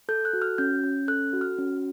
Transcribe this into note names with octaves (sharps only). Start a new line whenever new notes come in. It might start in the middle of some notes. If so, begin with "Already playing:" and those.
A4 G6
F#6
F#4
F6
C#4 G6
C#4
A4 F#6
F#4
F6
C#4